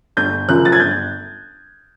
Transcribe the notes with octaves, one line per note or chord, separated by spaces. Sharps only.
G1 G6
F#2 C#3 F3 F#6
A6
G#6
G1 G6